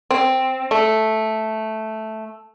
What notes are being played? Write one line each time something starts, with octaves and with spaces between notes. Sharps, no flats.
C4
A3